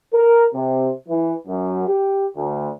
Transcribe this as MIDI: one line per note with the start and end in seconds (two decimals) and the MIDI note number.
0.14 0.46 70
0.54 0.91 48
1.08 1.34 52
1.48 1.85 42
1.88 2.29 67
2.37 2.69 38